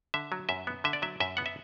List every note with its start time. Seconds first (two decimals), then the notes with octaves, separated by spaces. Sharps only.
0.14 D3 E5
0.32 F#3
0.49 F#2 E5
0.67 B3
0.84 D3 E5
0.93 D5
1.02 F#3 E5
1.20 F#2 E5
1.37 B3 F#5
1.46 E5